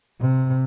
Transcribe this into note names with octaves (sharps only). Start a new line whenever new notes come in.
C3